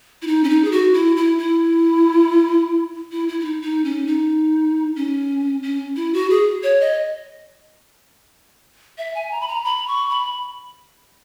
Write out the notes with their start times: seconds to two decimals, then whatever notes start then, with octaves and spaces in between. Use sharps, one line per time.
0.22 E4
0.27 D#4
0.44 C#4
0.49 D#4
0.64 G#4
0.72 F#4
0.94 E4
1.16 E4
1.38 E4
3.12 E4
3.28 E4
3.40 E4
3.45 D#4
3.62 D#4
3.85 C#4
4.07 D#4
4.96 C#4
5.63 C#4
5.96 E4
6.14 F#4
6.30 G#4
6.63 C#5
6.81 D#5
8.98 E5
9.15 G#5
9.32 A#5
9.41 B5
9.48 A#5
9.65 B5
9.88 C#6
10.10 B5